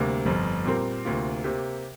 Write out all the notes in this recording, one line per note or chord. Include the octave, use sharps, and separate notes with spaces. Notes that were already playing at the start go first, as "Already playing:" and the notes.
Already playing: D2 C3 G3 A#3
G1 F2 F3
A#2 G3 C4 A#4
D2 C3 A#3 F4
C3 A#3 G4